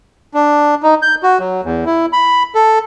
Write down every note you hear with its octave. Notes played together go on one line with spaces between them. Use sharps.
D4
D#4
G6
F#4
F#3
E2
E4
B5
A4